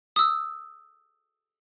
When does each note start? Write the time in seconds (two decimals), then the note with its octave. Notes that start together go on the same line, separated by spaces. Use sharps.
0.16 D#6 E6